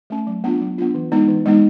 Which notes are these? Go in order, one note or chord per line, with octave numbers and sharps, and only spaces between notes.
A3 C#4
F#3
B3 D4 F4
F#3
B3 D4 F4
E3
G#3 B3 D#4
E3
G#3 B3 D#4